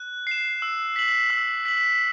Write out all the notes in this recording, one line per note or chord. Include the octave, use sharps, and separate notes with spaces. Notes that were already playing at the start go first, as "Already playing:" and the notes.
Already playing: F#6
C7 E7
E6
B6 F#7
E6
B6 F#7